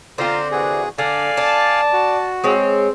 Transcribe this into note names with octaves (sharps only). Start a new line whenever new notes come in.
D3 C4 F4 C5 A#5
C3 E3 F#4 G#4
D3 D4 D5 F5 G#5
D4 A5
F#4
G#3 C4 C#5